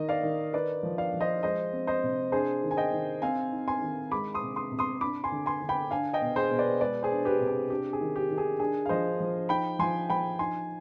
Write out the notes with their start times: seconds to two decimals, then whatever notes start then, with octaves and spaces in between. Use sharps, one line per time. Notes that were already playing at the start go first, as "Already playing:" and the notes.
Already playing: D#3 D#4 D#5
0.09 D5 F5
0.23 D#3
0.53 D#4 B4 D5
0.83 F3
0.98 D5 F5
1.13 F3
1.21 C5 D#5
1.43 G#3 C5 D#5
1.73 C4
1.87 C5 D#5
2.04 C3
2.32 D4 G#4 C5
2.63 D#3
2.71 G#5
2.77 D#5 G5
2.93 D#3
3.22 C4 F5 G#5
3.52 D#4
3.68 G#5 C6
3.82 D#3
4.11 G#3 B5 D6
4.34 C6 D#6
4.42 C3
4.56 C6 D#6
4.72 C3
4.79 C6 D#6
5.01 D4 B5 D6
5.24 G#5 C6
5.32 D3
5.46 G#5 C6
5.62 D3
5.69 G5 B5
5.91 D4 F5 G#5
6.13 D#5 G5
6.22 B2
6.36 G#4 C5
6.51 B2
6.58 B4 D5
6.81 G#3 B4 D5
7.03 G#4 C5
7.11 D4
7.25 G4 B4
7.41 C3
7.48 G#4
7.70 D4 G4
7.93 G#4
8.01 D#3
8.16 G4
8.30 D#3
8.38 G#4
8.60 D4 G#4
8.86 F5
8.89 F3 C5 D#5
9.20 F3
9.49 D#4 G5 B5
9.79 F3 G#5 C6
10.10 F3 G5 B5
10.39 D#4 G#5 C6